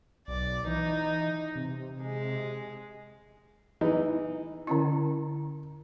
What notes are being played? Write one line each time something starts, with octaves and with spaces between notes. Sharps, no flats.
B1 D5
E3 D#4
C3
G#3
E3 D#4
D3 C#4 E4